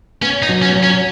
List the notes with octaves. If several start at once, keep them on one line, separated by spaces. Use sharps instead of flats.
B3 C#4
D#4
F#3
C#4
F#3
C#4